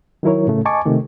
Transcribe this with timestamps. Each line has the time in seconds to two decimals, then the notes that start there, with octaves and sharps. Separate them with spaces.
0.23 D#3 F#3 E4 A#4 C#5
0.47 A2 C#3 A3
0.65 D#5 G#5 A5 C#6 D6
0.85 C3 D#3 A3